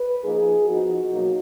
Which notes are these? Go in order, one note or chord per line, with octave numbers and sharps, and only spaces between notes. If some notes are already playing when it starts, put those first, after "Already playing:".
Already playing: B4
F3 A#3 D#4 G#4
F3 B3 D#4 F#4
B2 F#3 A#3 D#4